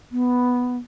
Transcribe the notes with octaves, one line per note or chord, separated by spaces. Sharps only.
B3